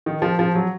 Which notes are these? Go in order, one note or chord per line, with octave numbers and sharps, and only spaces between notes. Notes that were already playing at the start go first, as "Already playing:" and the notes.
D#3
F3
F3
F#3